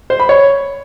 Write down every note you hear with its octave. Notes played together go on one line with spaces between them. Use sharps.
C5
B5
C#5